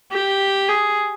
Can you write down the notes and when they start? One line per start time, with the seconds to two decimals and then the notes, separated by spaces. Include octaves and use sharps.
0.11 G4
0.68 G#4